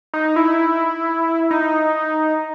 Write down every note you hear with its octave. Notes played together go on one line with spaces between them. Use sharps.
D#4
E4
D#4